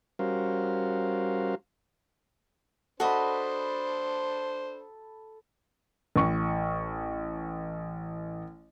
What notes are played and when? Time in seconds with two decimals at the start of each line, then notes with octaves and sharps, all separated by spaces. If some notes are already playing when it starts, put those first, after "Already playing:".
0.19 G3 C#4 F#4 A#4 C5 F5
3.00 D4 F#4 A4 C5 D#5 B5
6.16 A1 C#6